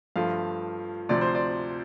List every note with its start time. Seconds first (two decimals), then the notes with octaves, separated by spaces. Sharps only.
0.16 G2 F3 A3 F5
1.09 D2 C3 F3 D5
1.21 C5
1.35 D5